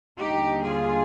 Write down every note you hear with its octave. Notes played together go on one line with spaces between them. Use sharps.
D#2 D3 G3 D#4 G4
F4 G#4